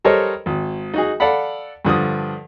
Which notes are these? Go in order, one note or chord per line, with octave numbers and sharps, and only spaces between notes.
G3 A4 A#4 C5 C#5 D#5
G#1
D#4 F#4 G#4
A4 D5 F5 F#5 B5
G2 D3 F3 D#6